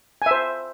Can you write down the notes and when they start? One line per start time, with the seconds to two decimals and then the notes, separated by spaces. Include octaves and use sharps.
0.22 G#5
0.26 E5
0.31 C5